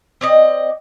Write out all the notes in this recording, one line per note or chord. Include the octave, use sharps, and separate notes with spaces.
C4 D5 D#5